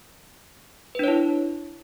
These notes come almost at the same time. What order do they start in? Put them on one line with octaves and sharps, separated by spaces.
B4 D4 C#5 E4